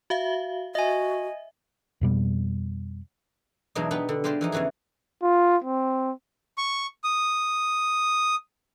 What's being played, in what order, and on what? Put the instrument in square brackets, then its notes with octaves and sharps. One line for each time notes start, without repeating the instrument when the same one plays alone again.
[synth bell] F#4 E5 F5
[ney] F#4 [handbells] D#5 G#5 [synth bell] E5
[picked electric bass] F2 B2 G3
[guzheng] E2 B2 F#3 G#3 D4 D#4
B3 D#4 G4 B4
D3
G#3 F4 G4 B4 C5 D5
E3 F3 D#4
E2 C#3 E3 F#4 G#4
[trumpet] F4
C4
[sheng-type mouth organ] C#6
D#6